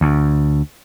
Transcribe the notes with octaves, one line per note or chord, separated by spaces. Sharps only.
D2